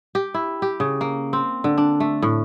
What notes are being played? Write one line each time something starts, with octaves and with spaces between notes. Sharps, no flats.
G4
E4
G4
C#3
A#3
C4
D3
D4
A3
A2